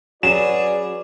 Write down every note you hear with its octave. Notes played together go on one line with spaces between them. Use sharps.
F#3 C#4 F#4 G#4 B4 D5 E7